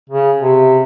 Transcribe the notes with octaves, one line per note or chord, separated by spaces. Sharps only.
C#3
C3